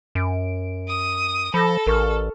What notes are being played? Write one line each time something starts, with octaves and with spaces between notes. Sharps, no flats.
F#2 D7
D#6
F3 A4 B5 E6 A#6
A1 A#4 C#6 F6